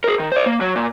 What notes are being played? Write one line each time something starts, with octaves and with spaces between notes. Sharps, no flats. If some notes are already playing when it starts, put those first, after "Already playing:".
G#4 A#4
D#3
C5 D5
A#3
F#3
A#2